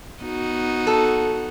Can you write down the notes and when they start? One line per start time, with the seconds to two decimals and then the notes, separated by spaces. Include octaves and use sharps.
0.22 B3 D#4 F#4
0.87 A4